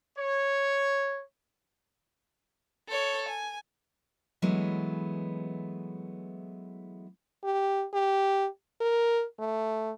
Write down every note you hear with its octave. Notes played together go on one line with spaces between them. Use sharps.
C#5
A4 C#5
G#5
E3 F#3 G#3 A3 B3 E4
G4
G4
A#4
A3